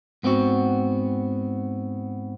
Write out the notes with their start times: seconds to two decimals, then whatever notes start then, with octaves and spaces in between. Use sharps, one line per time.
0.23 G#2 B3 C4 E4 F#4